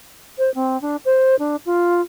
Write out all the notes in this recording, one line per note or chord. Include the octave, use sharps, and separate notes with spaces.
C5
C4
D4
C5
D4
F4